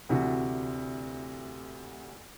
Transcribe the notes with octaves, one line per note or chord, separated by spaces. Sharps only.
D2 C3 E3 F#4